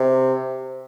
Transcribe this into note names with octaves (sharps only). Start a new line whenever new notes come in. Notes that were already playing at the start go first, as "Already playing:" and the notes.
Already playing: C3